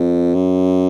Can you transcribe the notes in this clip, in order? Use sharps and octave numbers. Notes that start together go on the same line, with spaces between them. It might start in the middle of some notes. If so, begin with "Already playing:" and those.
Already playing: F2
F#2